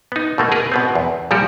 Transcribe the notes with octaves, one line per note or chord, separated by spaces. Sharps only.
B3 D#4
B2 A3 A#3
G#4 A#4 B4
B2 B3 C4
E2
A#2 F3 G3 F#4 G4